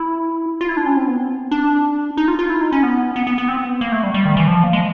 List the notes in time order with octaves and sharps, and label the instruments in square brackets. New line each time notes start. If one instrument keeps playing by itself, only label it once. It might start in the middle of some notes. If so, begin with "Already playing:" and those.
Already playing: [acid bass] E4
F4
E4
D4
C#4
C4
B3
C4
D4
D#4
F4
F4
E4
D#4
C#4
B3
B3
B3
B3
C4
B3
A#3
A3
G3
G3
D#3
E3
F3
A#3
G#3